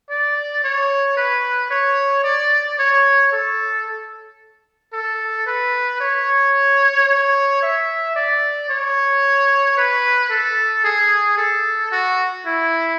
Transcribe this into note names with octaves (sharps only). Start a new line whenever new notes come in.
D5
C#5
B4
C#5
D5
C#5
A4
A4
B4
C#5
C#5
E5
D5
C#5
B4
A4
G#4
A4
F#4
E4